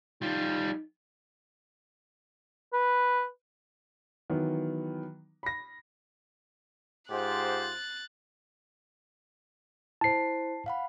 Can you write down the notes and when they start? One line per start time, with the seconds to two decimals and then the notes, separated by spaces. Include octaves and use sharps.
0.22 G3 D#4 F4
2.73 B4
4.30 D#3 E3 F#3 B3
5.43 B5 A#6
7.10 G#2 F4 G4 C5 F#6 A6
10.01 E4 C5 A5 C7
10.66 F5 F#5 B5